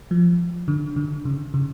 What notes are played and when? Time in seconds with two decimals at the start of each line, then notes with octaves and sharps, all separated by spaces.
0.11 F3
0.68 D3
0.96 D3
1.25 C#3
1.54 C#3